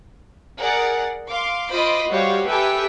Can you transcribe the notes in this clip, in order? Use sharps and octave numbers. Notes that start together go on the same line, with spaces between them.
G#4 A#4 D5 F#5
F5 C6 D6
F4 C5 D#5 B5 C6 D6
G3 F#4 G4 C5 C#5 F5
G4 A4 B4 E5 G5 G#5